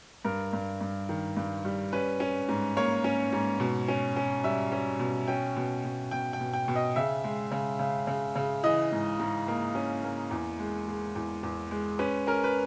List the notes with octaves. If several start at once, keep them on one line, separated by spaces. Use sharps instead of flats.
G2 A#4
G2
G2
D#3
G2
G3
C#4 B4
C#4
G#2
A#3 C#5
C#4
G#2
B2
C#4
C#4
G3 E5
C#4
B2
C#4 G5
B2
B2
B2 G5
G5
B2
G5
B2
D#5
C#3 E5
G#3
C#3
C#3
C#3
C#3
E3 D#5
G#2
G#2
A#3
C#4
A#3
E2
G#3
G#3
E2
E2
G#3
C#4 B4
C#4 A#4
B4